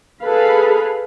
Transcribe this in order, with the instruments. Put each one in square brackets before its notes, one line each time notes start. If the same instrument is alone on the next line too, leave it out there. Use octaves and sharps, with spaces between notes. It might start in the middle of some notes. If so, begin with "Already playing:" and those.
[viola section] G#4 A4 B4 F5 B5